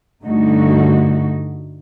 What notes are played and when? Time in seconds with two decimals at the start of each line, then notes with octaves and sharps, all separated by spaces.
0.23 G2 D3 A3 D#4 F#4